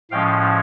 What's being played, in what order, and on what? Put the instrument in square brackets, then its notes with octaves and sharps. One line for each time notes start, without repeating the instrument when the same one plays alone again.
[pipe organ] A2 F3 G#3 C#4 F5 G5